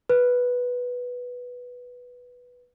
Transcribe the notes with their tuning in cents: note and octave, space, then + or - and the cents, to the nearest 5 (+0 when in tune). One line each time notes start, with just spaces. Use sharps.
B4 -5